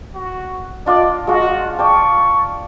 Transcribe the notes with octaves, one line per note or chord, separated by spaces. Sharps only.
F#4
D4 F4 D5 D#5
G#3 F4 F#4
D5 G5 A5 C#6